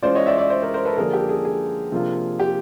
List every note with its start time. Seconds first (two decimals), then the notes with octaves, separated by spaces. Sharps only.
0.02 E3 G#3 C#4 F4 C5 D5
0.15 C#5 D#5
0.26 D5 E5
0.38 D5 E5
0.50 C5 D5
0.62 A#4 C5
0.74 A#4 C5
0.85 A4 B4
0.97 D3 F3 A#3 D4 G#4 A#4
1.13 G4 A4
1.29 G#4
1.45 G#4
1.92 C3 F3 A#3 D4 F4
2.40 G4